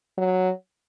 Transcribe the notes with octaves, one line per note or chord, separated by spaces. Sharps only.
F#3